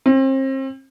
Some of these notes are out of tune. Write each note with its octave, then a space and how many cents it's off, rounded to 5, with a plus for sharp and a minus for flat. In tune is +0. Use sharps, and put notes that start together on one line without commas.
C4 +35